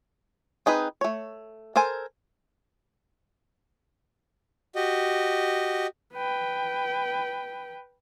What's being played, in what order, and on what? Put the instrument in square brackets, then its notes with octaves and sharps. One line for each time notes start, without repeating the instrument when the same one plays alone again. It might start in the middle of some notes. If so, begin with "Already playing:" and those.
[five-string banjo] C4 D#4 G#4 B4
A3 C#5
A4 A#4 C5 G#5
[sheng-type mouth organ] F#4 G4 D#5
[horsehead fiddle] B4 G5